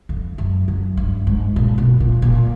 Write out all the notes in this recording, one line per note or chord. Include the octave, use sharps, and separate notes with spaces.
F2
F#2
F#2
G2
G#2
A#2
B2
A#2
A#2